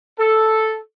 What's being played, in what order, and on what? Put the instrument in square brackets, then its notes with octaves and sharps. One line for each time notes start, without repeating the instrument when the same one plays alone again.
[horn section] A4